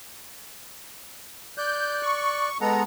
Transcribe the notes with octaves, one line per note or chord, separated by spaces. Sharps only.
D5 F#6 G6
C#6
G#3 B3 A4 F#5 A#5